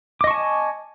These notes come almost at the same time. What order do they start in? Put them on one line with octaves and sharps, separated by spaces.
D6 D#5 C#6 A5 G#5